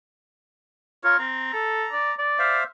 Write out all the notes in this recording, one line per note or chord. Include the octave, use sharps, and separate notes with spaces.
F4 A#4 C#5
C4 A#5
A4
D5
D5
C5 E5 F5